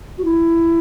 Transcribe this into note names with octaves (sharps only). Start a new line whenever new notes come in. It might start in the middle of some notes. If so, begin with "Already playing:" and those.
F#4
E4